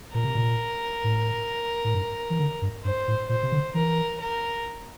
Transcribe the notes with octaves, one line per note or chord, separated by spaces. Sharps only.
A#2 A#4
C3
A#2
A2
A2
G2
E3
D3
G2
G2 C5
A2
A#2 C5
C3
D3
E3 A#4
A#4